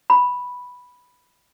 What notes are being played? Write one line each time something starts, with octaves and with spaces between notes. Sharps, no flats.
B5